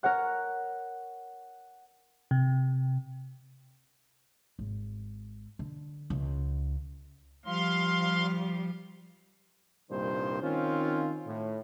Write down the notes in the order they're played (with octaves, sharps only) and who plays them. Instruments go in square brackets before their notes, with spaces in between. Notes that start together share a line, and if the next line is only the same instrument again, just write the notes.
[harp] A#4 C#5 F#5 F#6
[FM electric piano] C3
[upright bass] G#1
D3
C#2
[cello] F3 G3 [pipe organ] F5 C6
[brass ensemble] C2 G2 A#2 D#3 C5
D#3 C4 C#4 F4
A2